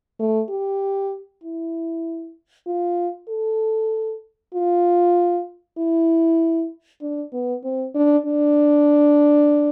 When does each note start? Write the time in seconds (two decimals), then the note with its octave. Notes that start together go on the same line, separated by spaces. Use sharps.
0.19 A3
0.49 G4
1.44 E4
2.67 F4
3.29 A4
4.54 F4
5.78 E4
7.01 D4
7.33 B3
7.64 C4
7.95 D4
8.26 D4